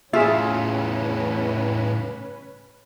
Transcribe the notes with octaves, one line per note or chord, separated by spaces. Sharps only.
A2 C#3 C#4 F4 G#4 B4 E5